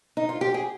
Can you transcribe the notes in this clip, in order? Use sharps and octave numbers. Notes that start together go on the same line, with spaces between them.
D#4
F4
G4
G#4